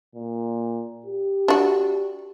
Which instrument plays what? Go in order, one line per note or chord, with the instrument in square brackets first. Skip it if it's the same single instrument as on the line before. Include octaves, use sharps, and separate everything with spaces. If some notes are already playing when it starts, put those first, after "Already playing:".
[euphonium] A#2
G4
[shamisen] D4 F#4